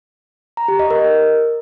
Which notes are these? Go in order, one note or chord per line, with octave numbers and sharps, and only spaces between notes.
A#5
G4
D#5
A#4